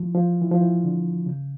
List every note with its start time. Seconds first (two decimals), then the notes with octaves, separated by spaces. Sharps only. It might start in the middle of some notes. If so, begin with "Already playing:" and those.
Already playing: E3 F3
0.14 F3
0.42 E3
0.51 F3
0.61 E3
0.84 D3
1.26 C#3